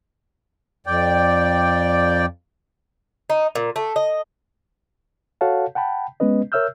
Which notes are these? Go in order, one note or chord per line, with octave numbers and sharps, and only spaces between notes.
F2 D5 G5
D#4
A#2
A3
D#5
F#4 A4 C#5 F5 F#5 A5
F#5 G5 A5 B5
G#3 B3 C#4 B4 D#5
A#4 C#5 E5 E6 F6 G6